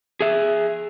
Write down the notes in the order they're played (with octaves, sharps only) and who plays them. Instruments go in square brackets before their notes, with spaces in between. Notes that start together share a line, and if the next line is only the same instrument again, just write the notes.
[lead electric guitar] G#4 E5